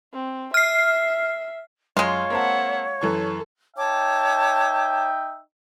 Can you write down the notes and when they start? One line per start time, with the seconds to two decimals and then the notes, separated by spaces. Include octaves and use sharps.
0.13 C4
0.54 E5 F6 C7
1.97 F#2 G#3 F4 C#5
2.30 A#3 C4 E5 F#5 A5
3.01 F#2 E3 A4 C#6
3.77 D#4 C#5 E5 G5 A5 D6